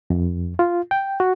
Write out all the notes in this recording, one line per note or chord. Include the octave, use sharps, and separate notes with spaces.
F2
F4
G5
F#4